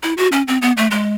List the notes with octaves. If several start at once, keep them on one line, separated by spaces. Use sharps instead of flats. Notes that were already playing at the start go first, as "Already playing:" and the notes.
E4
F#4
C#4
C4
B3
A3
G#3